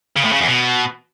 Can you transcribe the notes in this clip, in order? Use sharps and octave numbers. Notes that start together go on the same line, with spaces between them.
C#3
A2
C#3
E2
B2